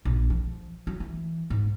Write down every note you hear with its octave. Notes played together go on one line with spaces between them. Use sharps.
A#1
F3
F#3
E3
G#2